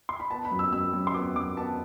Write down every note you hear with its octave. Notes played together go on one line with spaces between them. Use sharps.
C6
B5
B3 A5
B5
F#2
E6
F#2 E6
F#2
C6
B3 D6
F#2 D6
B3 A5